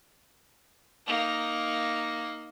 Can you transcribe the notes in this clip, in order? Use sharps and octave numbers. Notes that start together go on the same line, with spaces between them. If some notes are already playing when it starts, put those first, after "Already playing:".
A#3 D#4